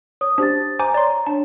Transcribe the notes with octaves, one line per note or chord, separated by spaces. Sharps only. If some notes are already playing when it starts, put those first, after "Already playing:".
C#5 D#6
D4 G4 C5 A6
C5 G#5 A#5 D6
C#5 D5 A#5 C6
D4 C#5 A5